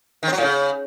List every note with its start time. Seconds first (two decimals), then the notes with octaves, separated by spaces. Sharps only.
0.23 D#3
0.28 C4
0.33 F#3
0.38 A2
0.43 C#3